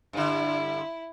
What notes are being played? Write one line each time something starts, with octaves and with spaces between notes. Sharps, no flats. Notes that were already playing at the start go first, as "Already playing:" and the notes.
G2 D3 E4